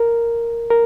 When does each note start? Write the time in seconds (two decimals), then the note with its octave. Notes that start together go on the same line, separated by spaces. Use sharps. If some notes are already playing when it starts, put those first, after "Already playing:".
Already playing: A#4
0.70 A#4